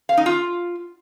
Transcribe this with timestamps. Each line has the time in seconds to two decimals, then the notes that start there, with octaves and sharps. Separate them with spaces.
0.09 F5
0.17 D#4
0.26 F4